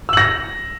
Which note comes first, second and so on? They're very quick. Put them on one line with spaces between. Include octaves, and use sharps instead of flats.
E6 F#7 A#6